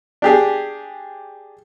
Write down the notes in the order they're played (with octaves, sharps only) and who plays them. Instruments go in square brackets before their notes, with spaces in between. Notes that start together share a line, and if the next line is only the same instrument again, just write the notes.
[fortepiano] D4 G4 G#4